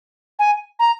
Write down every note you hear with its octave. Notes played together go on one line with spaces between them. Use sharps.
G#5
A#5